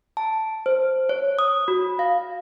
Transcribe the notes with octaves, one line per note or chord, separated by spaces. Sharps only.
A5
C5
C#5
D#6
F#4
F5